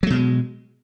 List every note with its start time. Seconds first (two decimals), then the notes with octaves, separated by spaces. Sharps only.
0.03 F#3
0.07 A3
0.10 B2
0.14 G#3